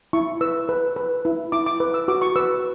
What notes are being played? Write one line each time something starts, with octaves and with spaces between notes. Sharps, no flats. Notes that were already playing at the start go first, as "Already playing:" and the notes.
E4 C#6
B4 E6
B4
B4
E4
E4 D6
D6
B4 D6
E6
F#4 D6
C#6
B4 E6